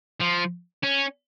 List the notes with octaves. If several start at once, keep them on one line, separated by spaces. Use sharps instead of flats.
F3
C#4